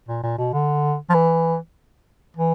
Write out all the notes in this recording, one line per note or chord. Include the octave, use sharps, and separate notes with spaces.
A#2
A#2
B2
D3
F3
E3
E3